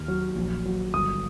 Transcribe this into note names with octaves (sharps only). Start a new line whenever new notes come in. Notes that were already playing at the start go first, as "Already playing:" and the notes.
Already playing: D#2 F6
F#3
A#1
F#3
G1 D#6